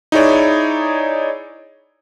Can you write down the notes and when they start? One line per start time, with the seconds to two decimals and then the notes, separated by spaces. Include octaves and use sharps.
0.12 D#4 E4 G#4 C#5 D5